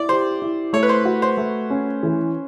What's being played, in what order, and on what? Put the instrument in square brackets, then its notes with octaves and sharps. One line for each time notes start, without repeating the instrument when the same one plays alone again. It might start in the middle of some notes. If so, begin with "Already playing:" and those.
Already playing: [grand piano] E4 [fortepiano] D5
[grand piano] G4 [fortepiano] C5
[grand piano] E4
[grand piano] A3 [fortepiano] C#5
[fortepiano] B4
C5
[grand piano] F#4
[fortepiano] C5
[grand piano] A3
C#4
E3